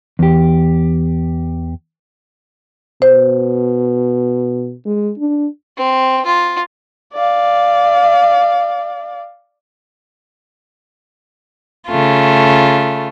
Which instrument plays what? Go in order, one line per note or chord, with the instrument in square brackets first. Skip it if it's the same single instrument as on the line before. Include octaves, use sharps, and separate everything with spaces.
[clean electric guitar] E2 G4
[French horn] B2 [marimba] C5
[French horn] G#3
D4
[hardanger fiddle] C4
F4
[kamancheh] D5 F5
[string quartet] C#3 A3 F4